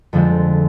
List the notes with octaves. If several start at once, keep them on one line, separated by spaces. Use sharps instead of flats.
F2 D3 F3 G#3 C4